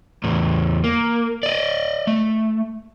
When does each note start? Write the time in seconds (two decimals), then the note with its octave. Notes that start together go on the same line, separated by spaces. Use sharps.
0.24 E2 A2
0.84 A#3
1.43 D5 D#5
2.07 A3